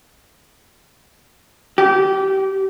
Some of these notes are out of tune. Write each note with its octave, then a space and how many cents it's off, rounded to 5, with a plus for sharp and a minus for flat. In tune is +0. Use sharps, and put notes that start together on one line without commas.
G4 -25